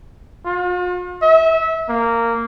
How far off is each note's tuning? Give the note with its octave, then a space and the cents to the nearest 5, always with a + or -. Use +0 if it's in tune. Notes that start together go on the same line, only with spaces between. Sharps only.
F4 +45
E5 -25
A#3 -10